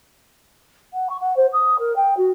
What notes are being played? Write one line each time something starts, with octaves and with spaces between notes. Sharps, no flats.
F#5
C#6
F#5
C5
D#6
A#4
G5
F#4